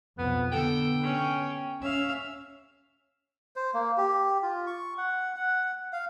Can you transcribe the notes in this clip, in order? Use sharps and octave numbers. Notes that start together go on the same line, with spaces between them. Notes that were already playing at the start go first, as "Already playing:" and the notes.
B1 F2 B3
D3 B3 A4 G5
C#4
C#4 E5 F5
C5
A#3
G4
F4
C#6
F#5
F#5
F5